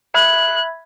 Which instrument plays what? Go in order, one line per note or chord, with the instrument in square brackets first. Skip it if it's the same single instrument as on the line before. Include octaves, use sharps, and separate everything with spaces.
[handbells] E5 B5 G#6 [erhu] F#6